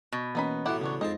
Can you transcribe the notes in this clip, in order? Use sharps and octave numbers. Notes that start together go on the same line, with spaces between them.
B2
E3 A#3 B3 C#4 D#4 B5
A1 A2 F#3 E4 G4 F#5
C#3 B3 D4 C#5
F2 G#3 C4 D#4 D#5 A5